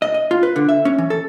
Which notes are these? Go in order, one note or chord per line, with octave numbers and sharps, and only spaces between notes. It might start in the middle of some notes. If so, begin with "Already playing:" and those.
D#5
D#5
F4
B4
D3
E5
C#4
E3
A4